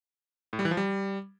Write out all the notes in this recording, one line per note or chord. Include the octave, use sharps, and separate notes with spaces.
A2
G3
E3
F3
G3